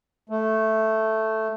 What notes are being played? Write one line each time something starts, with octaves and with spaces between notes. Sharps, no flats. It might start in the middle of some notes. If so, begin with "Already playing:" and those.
A3